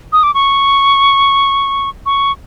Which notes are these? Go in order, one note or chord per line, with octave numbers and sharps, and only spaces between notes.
D#6
D6
C#6
C#6